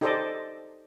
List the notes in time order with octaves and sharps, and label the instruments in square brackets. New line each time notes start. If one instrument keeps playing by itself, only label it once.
[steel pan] D#4 G4 A4 C5 D5 D#5